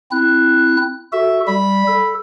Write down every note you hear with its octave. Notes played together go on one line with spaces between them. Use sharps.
C4 E4 F#6
F#4 A4 E5
G3 B5
A4